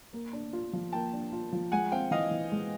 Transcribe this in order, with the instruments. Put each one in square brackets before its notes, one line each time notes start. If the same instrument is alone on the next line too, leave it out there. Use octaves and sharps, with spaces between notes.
[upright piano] A#3
D4
F4
F3
[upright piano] A#3 [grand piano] G5 A5
[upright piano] D4
F4
F3
[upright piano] G#3 [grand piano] F#5 G#5
[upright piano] C4 [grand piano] F5 G5
[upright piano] E3 [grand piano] D#5 F5
[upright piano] E3
G#3